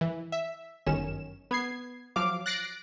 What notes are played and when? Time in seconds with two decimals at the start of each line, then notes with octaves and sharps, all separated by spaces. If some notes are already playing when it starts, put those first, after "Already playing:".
0.01 E3
0.32 E5
0.86 G1 F#2 D#3 C#4 E7
1.51 B3 G#6 C7
2.16 F3 F#3 F5 D6
2.46 F#6 A6 A#6 C7 D7